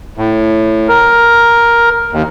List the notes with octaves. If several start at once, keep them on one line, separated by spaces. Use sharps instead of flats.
A2
A#4
D#2